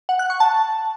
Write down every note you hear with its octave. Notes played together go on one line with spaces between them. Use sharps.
F#5
F#6
C#6
A5